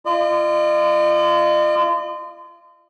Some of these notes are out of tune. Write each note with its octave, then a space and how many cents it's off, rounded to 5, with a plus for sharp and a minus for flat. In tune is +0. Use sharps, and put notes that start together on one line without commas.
F4 -35 D#5 -45